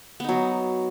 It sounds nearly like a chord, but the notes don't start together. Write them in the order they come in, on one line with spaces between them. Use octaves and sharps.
B3 D#4 F#3